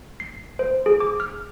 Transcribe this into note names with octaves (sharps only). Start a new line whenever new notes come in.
C7
C5
G#4
D6
F6